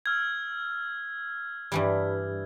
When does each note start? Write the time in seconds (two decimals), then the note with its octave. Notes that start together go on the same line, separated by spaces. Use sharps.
0.06 E6 F6 G#6
1.72 G2 E3 G3